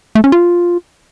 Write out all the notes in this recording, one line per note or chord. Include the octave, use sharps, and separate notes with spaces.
A3
C#4
F4